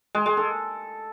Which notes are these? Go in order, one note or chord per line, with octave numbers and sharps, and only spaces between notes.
G#3
G#3
A4